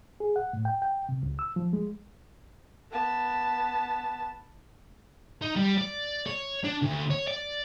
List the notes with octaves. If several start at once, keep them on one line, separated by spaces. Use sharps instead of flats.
G#4
F#5
A2
G5
G5
C3
C#2
E6
F3
G#3
B3 A5
D#4
G3
D5
C#5
D4
D2
C#5
D5